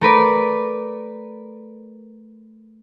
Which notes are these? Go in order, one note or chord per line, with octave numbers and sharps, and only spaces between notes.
A3 A#4 B4 D5